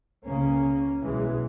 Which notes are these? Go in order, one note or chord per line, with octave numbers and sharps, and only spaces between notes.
C#2 C#3 A#3 C#4
B1 B2 E3 G#3